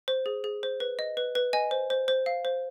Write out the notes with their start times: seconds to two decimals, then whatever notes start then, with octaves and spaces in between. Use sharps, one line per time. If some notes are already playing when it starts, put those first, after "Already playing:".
0.08 C5
0.26 G#4
0.44 G#4
0.63 C5
0.80 B4
0.99 D#5
1.17 B4
1.35 B4
1.53 D#5 G#5
1.71 C5
1.90 C5
2.08 C5
2.26 F5
2.45 C5